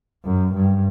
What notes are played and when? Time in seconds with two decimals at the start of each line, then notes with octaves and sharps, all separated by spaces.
0.25 F#2
0.55 G2